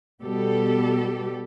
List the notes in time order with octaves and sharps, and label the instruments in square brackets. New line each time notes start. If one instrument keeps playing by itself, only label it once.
[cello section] B2 G3 G4 A4